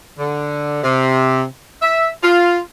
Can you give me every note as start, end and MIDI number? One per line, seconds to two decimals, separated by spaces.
0.18 0.82 50
0.83 1.43 48
1.82 2.08 76
2.23 2.59 65